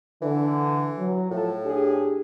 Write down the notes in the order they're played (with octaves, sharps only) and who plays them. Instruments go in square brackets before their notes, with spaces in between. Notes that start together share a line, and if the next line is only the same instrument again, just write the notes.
[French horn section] D3 [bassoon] E3
[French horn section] F#3
[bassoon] A2 [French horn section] F3 F#4 A4
[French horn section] D4 G4 G#4